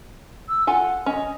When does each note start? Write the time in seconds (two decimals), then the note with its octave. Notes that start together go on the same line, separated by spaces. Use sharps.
0.49 E6
0.67 F4 A4 F#5 G#5
1.06 C#4 D#5